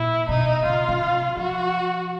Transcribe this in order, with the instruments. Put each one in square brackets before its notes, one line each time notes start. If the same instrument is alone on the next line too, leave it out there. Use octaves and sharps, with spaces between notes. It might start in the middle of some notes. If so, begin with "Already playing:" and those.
Already playing: [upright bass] A#2 [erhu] E4
[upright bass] B2 [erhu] D#4
[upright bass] C#3 [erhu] F4
[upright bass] C3
[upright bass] F3 [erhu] F#4